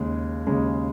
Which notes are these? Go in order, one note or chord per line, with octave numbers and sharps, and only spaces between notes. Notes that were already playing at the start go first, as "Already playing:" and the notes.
Already playing: D#2 C#3 G#3
D#2 C#3 G#3